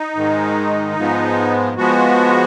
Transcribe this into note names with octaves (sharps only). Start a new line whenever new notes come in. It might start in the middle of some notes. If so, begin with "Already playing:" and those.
Already playing: D#4
G#2 D#3 G#3
G#2 F3 G#3 B3
F3 G#3 B3 F#4